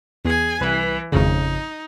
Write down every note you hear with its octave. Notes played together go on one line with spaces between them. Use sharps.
E2 G#4 G#5
C2 E3 B4
G#1 F2 C#3 D#4